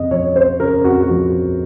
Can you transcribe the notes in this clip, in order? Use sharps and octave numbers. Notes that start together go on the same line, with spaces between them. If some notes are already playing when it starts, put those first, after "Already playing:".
Already playing: F2 C#3 C4 D#5
F3 C#5
C4 C5
C#3 A#4
F2 F#4
F#4
F3